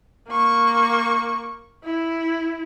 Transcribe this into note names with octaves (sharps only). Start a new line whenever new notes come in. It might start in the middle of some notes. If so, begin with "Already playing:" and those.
A#3 C#6
E4